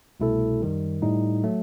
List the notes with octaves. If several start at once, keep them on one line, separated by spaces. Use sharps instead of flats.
C2 B2 A3 E4 A4
F#2 D#3 G3
A2 G3 D#4
F#3 A3